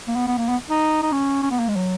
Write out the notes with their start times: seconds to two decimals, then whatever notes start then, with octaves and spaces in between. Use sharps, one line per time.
0.08 A#3
0.16 B3
0.27 B3
0.38 A#3
0.49 B3
0.70 D#4
1.03 D#4
1.12 C#4
1.43 C#4
1.51 B3
1.59 A#3
1.68 G#3
1.76 F#3